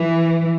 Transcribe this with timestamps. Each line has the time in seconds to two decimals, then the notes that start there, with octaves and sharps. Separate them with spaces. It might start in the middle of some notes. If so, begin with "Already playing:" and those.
Already playing: E3